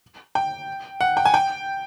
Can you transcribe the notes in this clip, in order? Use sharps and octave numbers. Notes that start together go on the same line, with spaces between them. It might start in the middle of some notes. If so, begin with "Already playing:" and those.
G5
F#5
G5
G#5
G5